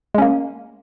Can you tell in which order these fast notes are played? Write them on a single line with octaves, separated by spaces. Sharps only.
G#3 C#4 A#3